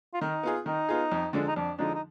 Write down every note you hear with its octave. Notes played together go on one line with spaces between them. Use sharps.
F4
D#3 D#4
B3 F4 G#4
D#3 D#4
B3 F4 G#4
F2
D3 F3 G#3 D4
D#4
F2 D4
D3 F3 G#3 D4 D#4
D#4